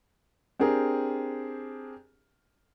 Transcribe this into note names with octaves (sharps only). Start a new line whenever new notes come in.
C4 D4 G4 G#4 A#4